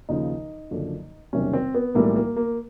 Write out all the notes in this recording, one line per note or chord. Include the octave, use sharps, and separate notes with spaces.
D#2 C#3 F3 D#4
F#1 F#2 D3 F3
F#1 E2 C3 D#3 G3 C#4
C4
B3
B1 A2 E3 G3 A#3
A#3
A#3